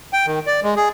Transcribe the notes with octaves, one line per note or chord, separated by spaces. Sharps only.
G5
D#3
D5
G#3
G#4